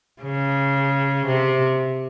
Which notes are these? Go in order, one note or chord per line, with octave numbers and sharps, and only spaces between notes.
C#3
C3